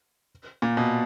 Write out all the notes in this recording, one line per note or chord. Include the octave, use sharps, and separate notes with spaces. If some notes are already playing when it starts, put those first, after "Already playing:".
A#2
B2